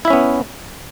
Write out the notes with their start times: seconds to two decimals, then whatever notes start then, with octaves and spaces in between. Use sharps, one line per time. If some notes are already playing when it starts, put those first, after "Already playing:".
0.05 E4
0.08 E5
0.10 C#4
0.13 B3